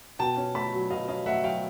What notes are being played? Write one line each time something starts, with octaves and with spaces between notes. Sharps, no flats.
B2 G5 A5
C#4
A3 A5 B5
F#3
B2 D#5 F5
C#4 D#5 F5
A3 E5 F#5
F#3 F5 G5